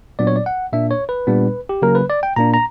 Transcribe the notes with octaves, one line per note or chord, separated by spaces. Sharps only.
A#2 F#3 B3 D4 D5
C#5
D5
F#5
A#2 A#3 D4 E5
C#5
B4
A#2 G3 B3 D4
G4
C#3 F#3 A#3 C#4 A#4
B4
D5
G5
A#2 A#3 D4 A#5
A#5